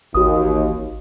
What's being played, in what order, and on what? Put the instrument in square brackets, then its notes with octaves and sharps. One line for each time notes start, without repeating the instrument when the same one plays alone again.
[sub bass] A1 [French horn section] D#2 [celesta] F#4 D#6